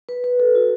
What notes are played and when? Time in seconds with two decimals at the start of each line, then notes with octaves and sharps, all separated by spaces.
0.09 B4
0.24 B4
0.40 A4
0.55 F#4